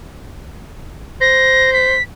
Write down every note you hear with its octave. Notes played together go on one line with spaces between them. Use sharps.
C5 A#6
B6